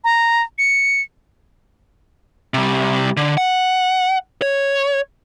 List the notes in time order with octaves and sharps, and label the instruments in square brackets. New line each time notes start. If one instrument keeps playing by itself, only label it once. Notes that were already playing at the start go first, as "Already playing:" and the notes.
[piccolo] A#5
C#7
[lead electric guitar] C3 G3
D3
F#5
C#5